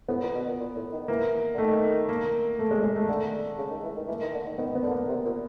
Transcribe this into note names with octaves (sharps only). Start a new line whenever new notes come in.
A2 B3
A#2
B2
A#2
A#2
A2
D#3
E3 A#3
D3
D#3 A3
A#3
A3
G#3
G#3
A3
D3 A3
C#3
D#3
E3
D#3
E3 A#3
D#3
D3
D#3
D#3 B3
B3
D3
A#3
C3
A#2